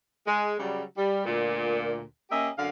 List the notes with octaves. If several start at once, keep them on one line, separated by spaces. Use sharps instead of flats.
G#3
C#3 F#3 G3
G3
D2 A#2
A#3 C#4 G4 D#5 E5
F#2 D3 F5